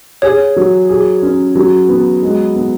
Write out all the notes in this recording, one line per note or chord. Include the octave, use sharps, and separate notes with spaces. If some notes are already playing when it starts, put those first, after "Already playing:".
G#4 C#5
F#3
G#4
C#4
F#3
B3
G#3
B3